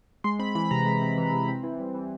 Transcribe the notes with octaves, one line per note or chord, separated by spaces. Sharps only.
G#3 C6
C4 B5
E3 B5
C3 A#5
G#3
C4
E3
C3
C4
E3
G3
E3